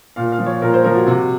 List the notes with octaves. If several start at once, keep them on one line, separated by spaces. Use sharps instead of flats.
A#2 F5
F5
F3
C#5
A#2 A#4
C5
F3 A#4
F#4
C3 F#4